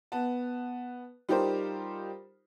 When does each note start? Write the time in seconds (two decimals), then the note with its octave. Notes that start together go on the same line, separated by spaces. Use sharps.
0.12 B3 A5
1.29 G3 D#4 F4 G4 A#4 C5